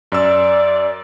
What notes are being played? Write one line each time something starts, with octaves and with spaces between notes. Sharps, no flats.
F#2 D5 E6